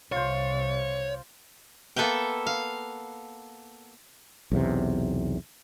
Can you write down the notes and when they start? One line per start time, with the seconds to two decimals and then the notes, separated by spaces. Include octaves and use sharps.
0.12 C2 C3 F4 C5 C#5
1.96 A#3 B3 A4 B4 E5 G5
2.47 F5
4.52 B1 E2 C3